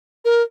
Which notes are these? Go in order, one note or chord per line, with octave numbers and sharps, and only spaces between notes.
A#4